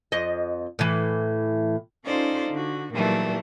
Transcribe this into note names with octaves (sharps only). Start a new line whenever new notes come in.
F2 D#5
A2 E3
C#4 D#4 F4 A4 C5 D5
D3 F#4
A#2 D#3 E3 F#3 G3 A3